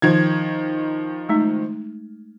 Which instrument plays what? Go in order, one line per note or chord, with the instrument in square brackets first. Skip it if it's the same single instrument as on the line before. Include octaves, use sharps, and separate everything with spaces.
[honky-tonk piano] D#3 F3 G#6
[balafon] G#3 A3 D#4